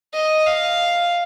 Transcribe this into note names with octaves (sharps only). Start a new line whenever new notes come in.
D#5
F5